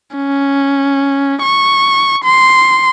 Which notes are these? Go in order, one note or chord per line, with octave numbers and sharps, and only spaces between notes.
C#4
C#6
C6